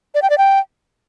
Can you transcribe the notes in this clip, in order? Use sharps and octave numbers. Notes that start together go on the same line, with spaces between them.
D5
G5
D5
G5